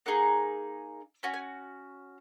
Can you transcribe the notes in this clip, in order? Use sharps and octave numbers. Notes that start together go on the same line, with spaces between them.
A#3 D#4 G#4 F#5
C#4 F#4 G#5
G#5